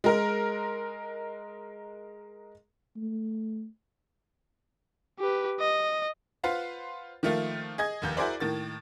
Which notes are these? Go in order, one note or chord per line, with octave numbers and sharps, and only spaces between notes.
G#3 A#4
A3
G4 B4
D#5
F4 B4 C5 F5 F#5
D#3 F3 A3 A#3 F4
G#4 D#5 G#6
F1 D#2 G6
E4 F#4 G#4 A#4 C5 D5
A2 D#3 A#3 A6